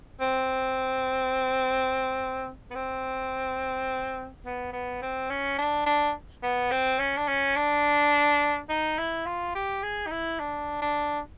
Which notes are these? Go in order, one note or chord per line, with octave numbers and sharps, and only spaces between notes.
C4
B3
C4
B3
B3
C4
C#4
D4
D4
B3
C4
C#4
D4
C#4
D4
D#4
E4
F4
G4
G#4
D#4
E4
D4
D4